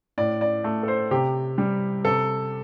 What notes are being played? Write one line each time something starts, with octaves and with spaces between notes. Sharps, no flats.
A2 D5
D5
A3
A4
C5
C3 G4
G3
C3 A4